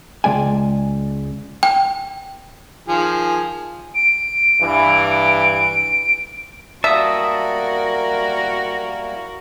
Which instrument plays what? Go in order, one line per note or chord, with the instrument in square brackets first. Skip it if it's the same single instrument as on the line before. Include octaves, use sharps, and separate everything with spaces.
[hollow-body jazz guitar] C#2 G#3 D5 G5 G#5
[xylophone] G5
[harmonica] D#3 F3 G#4
[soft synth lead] D7
[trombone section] G2 E3
[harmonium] G3 A#3 E4 [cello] F#4 A#4 [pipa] E5 [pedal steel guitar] A5 D#6